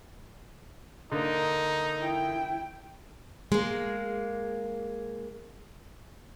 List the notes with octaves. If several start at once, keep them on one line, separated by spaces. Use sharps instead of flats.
D3 A#3 D#4
E4 G5
G#3 A#3